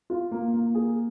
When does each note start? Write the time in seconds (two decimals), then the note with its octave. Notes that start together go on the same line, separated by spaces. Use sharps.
0.10 F4
0.31 A#3
0.53 A#3
0.75 G#4